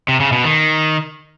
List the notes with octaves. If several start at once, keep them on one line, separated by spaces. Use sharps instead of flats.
C3
C#3
B2
D#3